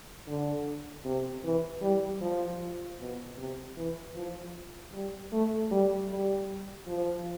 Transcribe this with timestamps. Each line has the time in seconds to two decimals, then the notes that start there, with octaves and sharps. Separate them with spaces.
0.27 D3
1.05 C3
1.44 E3
1.82 G3
2.21 F3
2.99 B2
3.37 C3
3.77 E3
4.16 F3
4.93 G3
5.32 A3
5.71 G3
6.10 G3
6.87 F3